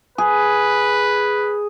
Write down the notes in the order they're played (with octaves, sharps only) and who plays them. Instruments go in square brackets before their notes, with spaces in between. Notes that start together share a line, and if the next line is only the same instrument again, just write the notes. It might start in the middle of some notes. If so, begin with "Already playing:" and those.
[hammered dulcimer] G#4 [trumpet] B4